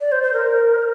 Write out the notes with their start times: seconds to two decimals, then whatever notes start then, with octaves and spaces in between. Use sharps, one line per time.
0.01 D5
0.12 C5
0.23 C5
0.33 A#4